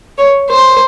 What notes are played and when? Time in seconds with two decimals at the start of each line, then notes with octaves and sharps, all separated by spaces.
0.18 C#5
0.50 C5